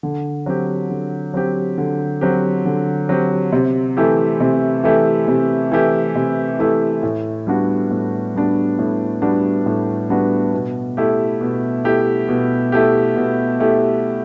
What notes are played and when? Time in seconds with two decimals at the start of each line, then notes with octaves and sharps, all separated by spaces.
0.03 D3
0.46 F#3 C4 G4
0.90 D3
1.34 F#3 C4 G4
1.78 D3
2.21 F#3 C4 G4
2.65 D3
3.09 F#3 C4 G4
3.52 C3
3.97 E3 A3 E4 G4
4.40 C3
4.84 E3 A3 E4 G4
5.28 C3
5.72 E3 A3 E4 G4
6.15 C3
6.59 E3 A3 E4 G4
7.03 A2
7.47 G3 B3 D4 F#4
7.91 A2
8.35 G3 B3 D4 F#4
8.79 A2
9.22 G3 B3 D4 F#4
9.66 A2
10.10 G3 B3 D4 F#4
10.53 B2
10.97 A3 E4 G4
11.41 B2
11.84 A3 E4 G4
12.29 B2
12.72 A3 E4 G4
13.16 B2
13.60 A3 E4 G4